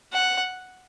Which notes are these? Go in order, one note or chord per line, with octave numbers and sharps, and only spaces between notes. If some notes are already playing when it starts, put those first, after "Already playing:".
F#5